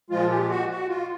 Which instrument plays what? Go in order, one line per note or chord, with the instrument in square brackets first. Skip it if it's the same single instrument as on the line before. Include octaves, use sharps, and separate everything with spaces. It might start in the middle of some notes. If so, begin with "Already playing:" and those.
[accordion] A#2 F3 G#3 F4
G4
F#4
F#4
F4